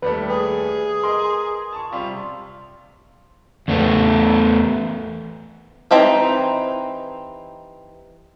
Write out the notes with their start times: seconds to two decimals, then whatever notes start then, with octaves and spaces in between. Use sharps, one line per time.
0.02 D#2 G3 A3 B4
0.30 G#4
1.03 A#4 D#5 C6
1.73 A5 C#6
1.92 C3 G3 F4
3.68 E2 A3 B3
5.91 E3 C4 D#4 G4